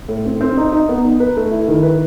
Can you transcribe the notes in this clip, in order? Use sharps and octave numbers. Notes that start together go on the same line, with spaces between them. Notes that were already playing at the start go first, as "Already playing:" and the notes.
A2
C4
C4
D#4
D#4
B3
D#4
B4
A3
E4
D#3
B4